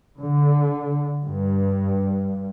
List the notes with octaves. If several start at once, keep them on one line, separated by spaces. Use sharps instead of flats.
D3
G2